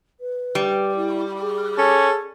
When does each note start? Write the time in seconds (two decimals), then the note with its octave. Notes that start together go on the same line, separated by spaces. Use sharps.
0.20 B4
0.55 G3
0.96 E4
1.41 G#4
1.78 C#4 A4